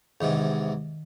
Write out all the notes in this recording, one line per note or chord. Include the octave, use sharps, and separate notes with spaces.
E2 G#2 C3 D#3